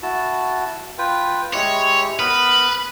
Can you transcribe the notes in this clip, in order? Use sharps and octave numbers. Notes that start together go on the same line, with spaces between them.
E4 F#4 A5
F4 B4 G5
G#3 E4 G4 C#5
B3 A#4 B4 D#6